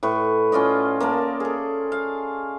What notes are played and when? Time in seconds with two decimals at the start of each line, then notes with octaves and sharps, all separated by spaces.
0.03 A2 B4 C#6
0.52 C#4 F4 D5 D#5
1.00 A#3 A#4 A5
1.40 G#4 A4
1.92 F5